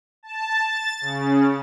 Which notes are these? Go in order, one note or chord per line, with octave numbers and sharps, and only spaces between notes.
A5
A6
C#3